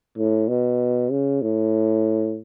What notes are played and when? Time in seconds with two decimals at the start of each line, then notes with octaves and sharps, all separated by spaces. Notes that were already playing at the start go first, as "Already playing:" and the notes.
0.18 A2
0.48 B2
1.11 C#3
1.42 A2